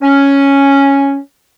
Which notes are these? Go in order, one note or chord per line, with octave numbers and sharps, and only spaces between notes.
C#4